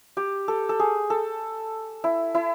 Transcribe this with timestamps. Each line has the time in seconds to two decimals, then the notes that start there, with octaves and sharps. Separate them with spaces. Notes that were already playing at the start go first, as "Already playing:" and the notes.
0.17 G4
0.48 A4
0.69 A4
0.80 G#4
1.10 A4
2.04 E4
2.35 E4